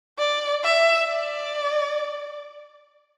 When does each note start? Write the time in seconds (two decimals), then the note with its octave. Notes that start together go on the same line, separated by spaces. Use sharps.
0.18 D5
0.64 E5
1.09 D5